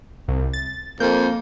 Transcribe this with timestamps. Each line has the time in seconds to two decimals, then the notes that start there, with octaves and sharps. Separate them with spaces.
0.28 C2
0.53 A6
1.00 F2 A#3 G6